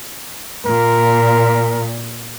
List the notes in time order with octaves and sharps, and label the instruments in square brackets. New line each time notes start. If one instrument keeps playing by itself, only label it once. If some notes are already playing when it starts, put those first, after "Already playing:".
[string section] A#2 [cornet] A#4